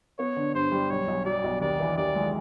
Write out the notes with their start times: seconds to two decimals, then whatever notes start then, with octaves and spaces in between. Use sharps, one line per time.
0.19 B3 C#5
0.36 D3
0.54 G2 C5
0.72 G3
0.90 B1 C#5
1.08 B1
1.25 F#3 D5
1.44 B1
1.61 D#2 D5
1.80 E3
1.98 D#2 D5
2.15 G#3